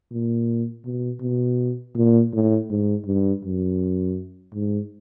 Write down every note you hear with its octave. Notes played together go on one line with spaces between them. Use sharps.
A#2
B2
B2
A#2
A2
G#2
G2
F#2
G#2